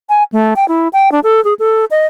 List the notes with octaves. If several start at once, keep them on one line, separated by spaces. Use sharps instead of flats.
G#5
A3
G5
E4
G5
D4
A4
G#4
A4
D#5